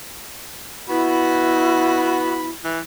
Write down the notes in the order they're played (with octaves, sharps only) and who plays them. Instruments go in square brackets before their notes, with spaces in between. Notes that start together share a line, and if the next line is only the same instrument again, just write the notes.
[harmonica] B3 F#4 B5 [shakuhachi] E4
[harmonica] E3